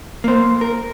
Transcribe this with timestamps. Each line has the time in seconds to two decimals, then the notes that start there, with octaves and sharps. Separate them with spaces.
0.24 A#3 C5
0.61 A#4